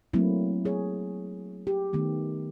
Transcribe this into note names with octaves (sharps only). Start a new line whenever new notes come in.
F#3 A3 A#3 C4 E4
G#4 C#5
G4
D#3 A3 B3